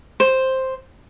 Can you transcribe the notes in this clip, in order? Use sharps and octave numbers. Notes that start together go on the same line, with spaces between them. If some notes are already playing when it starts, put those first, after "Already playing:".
C5